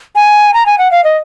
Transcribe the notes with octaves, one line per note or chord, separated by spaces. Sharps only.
G#5
A#5
G#5
F#5
F5
D#5